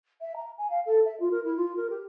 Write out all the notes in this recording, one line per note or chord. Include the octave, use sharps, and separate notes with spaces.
E5
A#5
G#5
F5
A4
E5
F4
A#4
E4
F4
A#4
G4